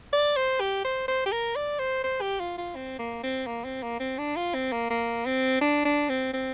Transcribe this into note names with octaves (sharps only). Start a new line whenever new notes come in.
D5
C5
G4
C5
C5
G4
A#4
D5
C5
C5
G4
F4
F4
C4
A#3
C4
A#3
C4
A#3
C4
D4
F4
C4
A#3
A#3
C4
D4
D4
C4
C4